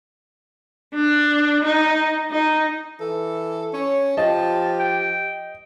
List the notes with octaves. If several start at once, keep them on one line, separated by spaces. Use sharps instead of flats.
D4
D#4
D#4
E3 A4
C#4 C#5
F3 G4 D#5 A5
G5